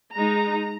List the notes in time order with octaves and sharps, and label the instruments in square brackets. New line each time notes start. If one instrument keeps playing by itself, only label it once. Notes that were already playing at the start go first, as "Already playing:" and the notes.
[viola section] G#3 D#4 A#5